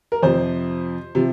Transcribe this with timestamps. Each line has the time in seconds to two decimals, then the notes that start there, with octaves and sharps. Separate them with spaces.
0.12 A#4
0.23 F2 C3 F3 C5
1.15 C3 F3